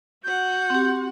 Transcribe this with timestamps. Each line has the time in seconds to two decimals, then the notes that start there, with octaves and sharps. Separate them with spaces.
0.23 F#4 F#5 G6
0.70 C4 G4